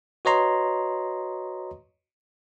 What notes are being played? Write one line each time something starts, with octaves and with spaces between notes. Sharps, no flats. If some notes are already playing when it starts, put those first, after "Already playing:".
F#4 B4 C#5 D#5 A#5 C6